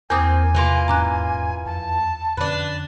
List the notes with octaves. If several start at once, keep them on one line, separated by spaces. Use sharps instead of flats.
E2 A#3 C4 G#5 D6 D#6
C3 E3 A#3 F4
D#1 G#2 C#4 A#5 D6 F#6
F2 A5
F2 D3 C#4 D4 B4